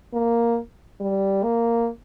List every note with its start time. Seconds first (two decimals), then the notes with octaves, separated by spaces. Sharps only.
0.13 A#3
1.00 G3
1.43 A#3